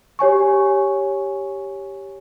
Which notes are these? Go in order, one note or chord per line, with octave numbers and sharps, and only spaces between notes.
G4 C#5 G#5 C#6